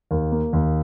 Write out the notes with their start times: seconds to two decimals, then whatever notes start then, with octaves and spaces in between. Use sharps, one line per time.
0.11 D#2
0.32 A#3
0.53 D#2